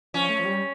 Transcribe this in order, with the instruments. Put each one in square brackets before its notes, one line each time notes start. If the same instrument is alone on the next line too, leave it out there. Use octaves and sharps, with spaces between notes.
[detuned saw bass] F3 [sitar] C#4
[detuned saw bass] A3
F3
G3